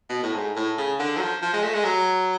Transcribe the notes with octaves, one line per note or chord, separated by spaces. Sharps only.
B2
A2
G#2
A2
C#3
D3
F#3
F3
F3
G#3
A3
G#3
F#3